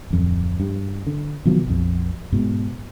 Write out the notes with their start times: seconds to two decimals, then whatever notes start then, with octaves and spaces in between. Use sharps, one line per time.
0.10 D1 F2
0.60 G2
1.07 D3
1.45 B2 D#3 F3 F#3
1.67 A#1 F2
2.32 G#2 B2